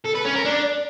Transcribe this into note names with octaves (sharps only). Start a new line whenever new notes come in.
A4
B4
C#4
A#4
D4